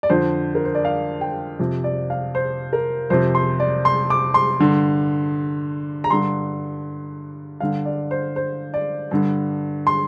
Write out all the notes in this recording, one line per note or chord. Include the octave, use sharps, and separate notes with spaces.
D5
F2 D3 C5
A#4
C5
D5
F5
G5
F2 C3
D5
F5
C5
A#4
F2 C3 C5
C6
D5
C6
D6
C6
G2 D3
A#5
G2 D3 C6
G2 D3 F5
D5
C5
C5
D5
G2 D3
C6